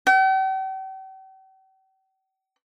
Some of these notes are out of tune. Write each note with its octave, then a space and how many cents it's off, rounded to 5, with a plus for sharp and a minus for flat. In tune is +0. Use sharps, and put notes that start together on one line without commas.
G5 -45